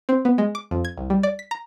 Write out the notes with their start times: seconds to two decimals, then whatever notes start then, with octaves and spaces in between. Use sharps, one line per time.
0.09 C4
0.25 B3
0.38 G#3
0.55 D6
0.71 F2
0.85 G#6
0.98 C2
1.10 G3
1.23 D5
1.39 B6
1.51 A#5